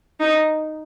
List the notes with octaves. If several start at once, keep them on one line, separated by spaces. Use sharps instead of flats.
D#4